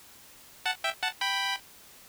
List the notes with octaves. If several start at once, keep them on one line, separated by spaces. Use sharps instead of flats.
F#5 A5
E5 G5
F#5 A5
G5 B5